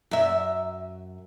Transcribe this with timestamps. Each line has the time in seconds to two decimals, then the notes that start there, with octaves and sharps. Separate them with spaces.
0.11 F#2 E5